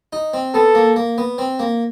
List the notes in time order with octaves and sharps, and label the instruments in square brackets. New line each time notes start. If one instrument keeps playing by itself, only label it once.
[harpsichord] D#4
C4
[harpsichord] B3 [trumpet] A4
[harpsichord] A#3
A#3
B3
C4
A#3